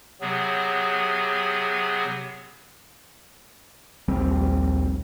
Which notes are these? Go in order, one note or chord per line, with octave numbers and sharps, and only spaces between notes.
C3 F#3 B3 G#4
A#1 D#2 G3 C4